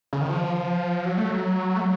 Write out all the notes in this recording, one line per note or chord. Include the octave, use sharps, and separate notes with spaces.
C#3
D#3
F3
F#3
A3
F#3
A3
F#3